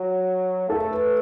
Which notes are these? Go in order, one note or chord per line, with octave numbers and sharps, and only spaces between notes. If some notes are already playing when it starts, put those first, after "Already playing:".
Already playing: F#3 F#4
A3 A4
B4